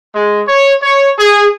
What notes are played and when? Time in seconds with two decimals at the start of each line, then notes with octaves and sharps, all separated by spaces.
0.15 G#3
0.47 C#5
0.81 C#5
1.18 G#4